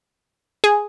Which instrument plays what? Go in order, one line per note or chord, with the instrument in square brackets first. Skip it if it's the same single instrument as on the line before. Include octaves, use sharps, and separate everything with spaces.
[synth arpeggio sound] G#4